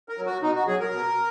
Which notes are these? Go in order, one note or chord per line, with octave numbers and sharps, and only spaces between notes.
A#4
F#3
F#4
B2 D#4
F#4
F#3 G#4
A#4
B2